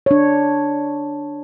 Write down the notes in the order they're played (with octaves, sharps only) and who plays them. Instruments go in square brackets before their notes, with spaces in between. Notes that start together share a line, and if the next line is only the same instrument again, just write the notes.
[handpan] D4 C#5